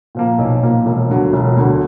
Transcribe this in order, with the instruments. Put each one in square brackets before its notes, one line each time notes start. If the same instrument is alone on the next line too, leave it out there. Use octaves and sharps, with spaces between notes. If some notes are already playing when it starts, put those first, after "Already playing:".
[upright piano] A#2 F3 A#3
B1
A#2 F3 A#3
E1
D2 D3 F#3
E1
D2 D3 F#3